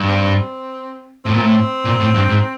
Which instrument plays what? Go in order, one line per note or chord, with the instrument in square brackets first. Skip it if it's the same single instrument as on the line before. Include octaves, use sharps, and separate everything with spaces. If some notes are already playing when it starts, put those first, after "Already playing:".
Already playing: [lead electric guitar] G2
[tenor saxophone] C4
[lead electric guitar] A2 [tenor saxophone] C4
[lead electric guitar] A#2
A2
A#2
A2
G2
G#2